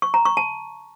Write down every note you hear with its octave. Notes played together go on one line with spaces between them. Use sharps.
C#6
A#5
C#6
A5